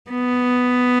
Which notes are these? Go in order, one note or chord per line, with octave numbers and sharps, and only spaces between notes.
B3